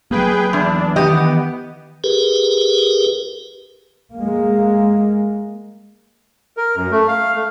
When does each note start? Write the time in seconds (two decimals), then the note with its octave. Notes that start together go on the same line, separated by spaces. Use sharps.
0.11 F#3 A3 A#3 G#4 B4 G5
0.53 E2 D4
0.96 D#3 E3 B3 G4 D#5
2.04 G4 G#4 A#4 B4
4.15 G#3 A#3
6.57 A#4
6.76 F#2
6.91 A3
7.08 F5
7.34 A3